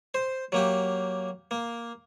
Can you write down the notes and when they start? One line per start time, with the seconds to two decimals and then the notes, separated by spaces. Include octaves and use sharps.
0.14 C5
0.52 F#3 A#3 G4
1.51 A#3